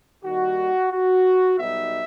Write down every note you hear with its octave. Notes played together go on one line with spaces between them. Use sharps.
D#2 D#3 G3 D#4 F#4
F#4
B1 B2 G3 D#4 E5